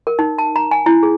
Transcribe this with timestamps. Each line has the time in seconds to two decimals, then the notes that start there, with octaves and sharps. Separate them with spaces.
0.07 A#4
0.19 D#4
0.38 A5
0.56 A#5
0.71 G#5
0.86 E4
1.03 G#4